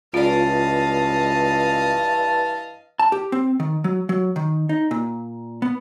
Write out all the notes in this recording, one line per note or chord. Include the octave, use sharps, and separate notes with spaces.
C#2 G2 E3 F4 D5 D#5 F5 A5
A5
G4
C4
D#3
F#3
F#3
D#3
D#4
A#2
B3